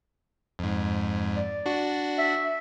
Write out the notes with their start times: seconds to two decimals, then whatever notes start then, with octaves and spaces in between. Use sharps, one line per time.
0.59 F2 G#2
1.35 D5
1.66 D4 F#4
2.18 E5